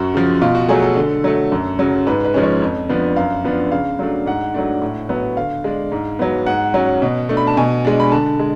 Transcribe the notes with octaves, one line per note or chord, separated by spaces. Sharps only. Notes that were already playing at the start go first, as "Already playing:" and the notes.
Already playing: F#2 F#4
C#3 F3
B2 F4
F#4
F#3 A3 G#4
A4
D3
F#3 A3
F#2
C#3 F#3
G#2 B4
B4
F3 G#3 C#4
C#5
F2
F3 B3 D4
F#2 F5
F3 B3 D4
C#3 F5
F#3 A3 D4
G#2 F#5
F#3 A3 D4
A2
F#3 B3
D3 F5
G#3 D4
G#2
F#3 B3
G#2 F#5
F#3 C#4
B2
A3 D4
B5
A5
B2 G#5
G#3 D4
B5
D3 A5
G#3